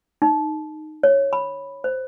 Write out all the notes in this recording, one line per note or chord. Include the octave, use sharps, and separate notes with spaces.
D#4
C#5
B5
C5